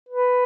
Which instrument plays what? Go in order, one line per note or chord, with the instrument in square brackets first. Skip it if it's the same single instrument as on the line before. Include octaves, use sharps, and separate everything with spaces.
[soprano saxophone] B4